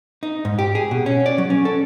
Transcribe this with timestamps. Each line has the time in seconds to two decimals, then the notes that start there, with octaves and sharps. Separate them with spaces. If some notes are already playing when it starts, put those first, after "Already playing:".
0.23 D#4
0.45 G#2
0.59 G4
0.75 G#4
0.91 B2
1.06 C#4
1.26 D5
1.38 F#3
1.50 C#4
1.65 A4